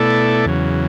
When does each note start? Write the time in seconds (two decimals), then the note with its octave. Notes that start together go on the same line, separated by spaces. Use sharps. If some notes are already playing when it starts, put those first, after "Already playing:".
Already playing: B2 A3 E4 A4 D5
0.45 E2 C#3 F#3